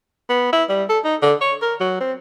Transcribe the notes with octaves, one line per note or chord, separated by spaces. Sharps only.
B3
E4
G3
A4
D#4
D3
C#5
A#4
F#3
C4